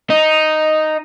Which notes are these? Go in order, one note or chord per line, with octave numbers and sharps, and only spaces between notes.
D#4